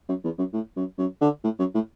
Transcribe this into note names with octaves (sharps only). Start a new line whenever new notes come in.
F#2
E2
F#2
A2
F#2
F#2
D3
A2
F#2
A2